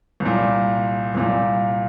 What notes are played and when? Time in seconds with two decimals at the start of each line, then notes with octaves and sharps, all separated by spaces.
0.20 C2
0.25 A#2
1.15 C2 A#2